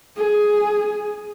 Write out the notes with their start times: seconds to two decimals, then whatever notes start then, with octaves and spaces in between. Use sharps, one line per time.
0.16 G#4